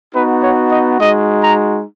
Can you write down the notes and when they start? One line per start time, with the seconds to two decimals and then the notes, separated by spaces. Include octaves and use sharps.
0.13 B3 D#4 F#4 B4
0.42 C#5
0.71 D#5
0.98 G#3 D#4 F#4 D#5
1.41 A#5